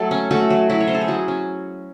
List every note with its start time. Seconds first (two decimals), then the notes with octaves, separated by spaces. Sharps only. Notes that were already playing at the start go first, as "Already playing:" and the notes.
Already playing: F#3 A3 A4
0.11 C#4
0.31 A3 F#4
0.50 F#3
0.70 F#3 E4
0.80 C#5
0.87 C#4 C5
0.95 A4
1.01 G#4
1.08 F#3 F#4
1.28 C#4